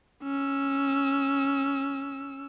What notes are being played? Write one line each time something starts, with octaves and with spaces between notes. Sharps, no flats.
C#4 E6